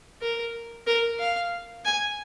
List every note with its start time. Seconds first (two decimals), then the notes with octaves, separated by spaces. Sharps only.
0.21 A#4
0.87 A#4
1.19 F5
1.85 G#5